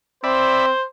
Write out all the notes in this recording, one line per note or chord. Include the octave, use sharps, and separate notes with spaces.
C4 C5 D5 E5 B5